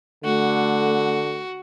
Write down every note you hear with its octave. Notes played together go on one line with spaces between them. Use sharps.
D3 A3 F#4